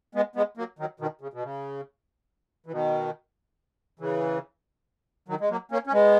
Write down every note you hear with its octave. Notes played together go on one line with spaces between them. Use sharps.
G#3 B3
G#3 B3
F#3 A#3
D#3 F#3
B2 D#3
C#3
B2
C#3
E3
B2 D#3
C#3 E3
D#3 F#3
G#3
F#3 A#3
A#3 C#4
C#4
G#3 B3